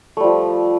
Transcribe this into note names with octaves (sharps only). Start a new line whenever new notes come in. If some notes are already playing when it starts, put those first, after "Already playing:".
F3 G3 A3